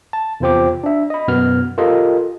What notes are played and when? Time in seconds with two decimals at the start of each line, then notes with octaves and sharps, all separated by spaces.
0.13 A5
0.40 E2 C3 F4 C5 G5 D6
0.84 D4 E5
1.10 D#5 B5
1.28 F#2 B2 B3 F6
1.78 F4 G4 A4 A#4 D#5